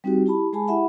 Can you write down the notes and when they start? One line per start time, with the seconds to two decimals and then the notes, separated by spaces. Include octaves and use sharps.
0.04 G3 C4 D#4 F#4 G4
0.26 E4 G4 A5 B5
0.53 G#3 G#4 G#5 A5 B5
0.68 E4 G4 E5 F#5 B5